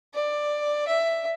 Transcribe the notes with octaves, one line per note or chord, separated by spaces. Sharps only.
D5
E5